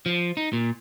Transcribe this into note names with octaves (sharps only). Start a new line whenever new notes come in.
F3
D#4
A#2